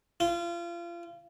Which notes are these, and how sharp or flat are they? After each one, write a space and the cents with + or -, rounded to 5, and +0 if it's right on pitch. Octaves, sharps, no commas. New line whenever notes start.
F4 -30